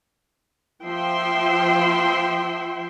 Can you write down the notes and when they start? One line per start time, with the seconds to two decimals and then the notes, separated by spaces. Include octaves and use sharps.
0.84 F3 E5 G5 C6